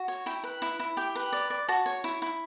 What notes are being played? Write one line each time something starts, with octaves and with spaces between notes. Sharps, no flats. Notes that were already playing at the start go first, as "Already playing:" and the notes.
Already playing: F#4
C#5
E4 G5
B4
E4
E4
G4 G5
B4
D5
D5
F#4 A5
C#5
E4
E4